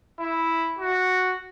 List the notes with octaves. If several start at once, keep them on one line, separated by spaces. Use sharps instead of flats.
E4
F#4